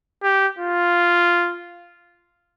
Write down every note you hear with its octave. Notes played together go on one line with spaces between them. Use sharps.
G4
F4